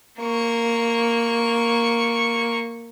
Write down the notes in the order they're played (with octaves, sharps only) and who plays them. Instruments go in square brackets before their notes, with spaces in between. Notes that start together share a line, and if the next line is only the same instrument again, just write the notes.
[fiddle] A#3 C#6